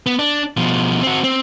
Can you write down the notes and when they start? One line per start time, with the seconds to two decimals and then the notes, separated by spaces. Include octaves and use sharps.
0.06 B3
0.19 D4
0.57 B2 F3
1.03 C4 F#4
1.24 C4